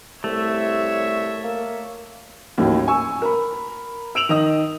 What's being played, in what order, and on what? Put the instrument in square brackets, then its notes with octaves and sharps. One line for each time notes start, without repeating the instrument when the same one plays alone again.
[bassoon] C2 [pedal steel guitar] A3 [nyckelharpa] C#5 E5
[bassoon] A#3
[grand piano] D#2 A2 D#3 F#3 C#4
G#5 C#6 E6
A#4 B5
E6 D7 F7 F#7
D#3 D#5 D#6